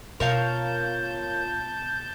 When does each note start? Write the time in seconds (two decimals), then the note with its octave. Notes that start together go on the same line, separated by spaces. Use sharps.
0.20 B2 F4 A#4 C#5 F5 A5 G6